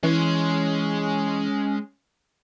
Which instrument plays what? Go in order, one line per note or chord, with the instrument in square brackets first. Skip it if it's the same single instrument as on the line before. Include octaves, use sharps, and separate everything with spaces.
[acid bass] E3 [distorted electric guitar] G#3 C6 [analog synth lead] C#4